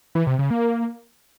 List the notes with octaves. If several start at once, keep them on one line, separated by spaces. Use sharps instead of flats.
E3
C3
C#3
A#3